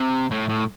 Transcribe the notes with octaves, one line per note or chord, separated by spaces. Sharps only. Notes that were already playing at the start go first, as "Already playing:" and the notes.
Already playing: C3
A2
A2